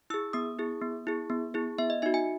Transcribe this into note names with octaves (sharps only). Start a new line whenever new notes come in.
E4 G#4 E6
B3 D#6
E4 G#4
B3
E4 G#4
B3
E4 G#4
B3 E5
D#5
D#4 F#4 E5
G#5